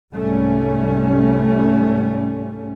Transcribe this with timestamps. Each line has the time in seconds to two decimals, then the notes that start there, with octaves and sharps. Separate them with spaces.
0.13 C2 G#2 G3 A3 C#4